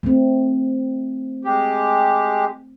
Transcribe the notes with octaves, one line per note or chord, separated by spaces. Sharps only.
A3 C4
G#3 G4